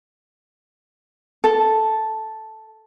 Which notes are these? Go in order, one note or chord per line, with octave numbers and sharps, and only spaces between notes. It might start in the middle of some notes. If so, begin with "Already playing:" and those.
A4